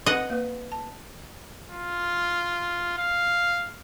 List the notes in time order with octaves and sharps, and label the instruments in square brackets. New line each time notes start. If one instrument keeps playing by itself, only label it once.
[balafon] C4 B4 [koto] D#5 F#5
[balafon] A#3 B4
A5
[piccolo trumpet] F4
F5